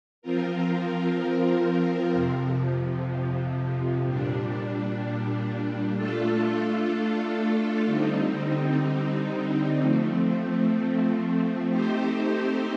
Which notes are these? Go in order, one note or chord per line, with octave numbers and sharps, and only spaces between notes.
F3 C4 F4 A#4
F2 C3 F3
A#2 G3 D4
A3 D4 F4 A4
D3 G3 C4 D#4
F3 A3 C4
A3 C4 D#4 G4 C5